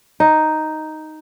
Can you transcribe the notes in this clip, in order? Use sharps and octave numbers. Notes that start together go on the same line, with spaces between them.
D#4